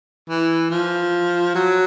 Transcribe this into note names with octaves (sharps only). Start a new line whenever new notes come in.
E3
F3
F#3